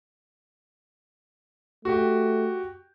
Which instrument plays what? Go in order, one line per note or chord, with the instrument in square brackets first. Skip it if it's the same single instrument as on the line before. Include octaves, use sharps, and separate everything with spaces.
[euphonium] A3 [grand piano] F#4 G4